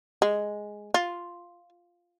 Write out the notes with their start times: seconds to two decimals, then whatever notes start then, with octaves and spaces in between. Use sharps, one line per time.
0.22 G#3
0.94 F4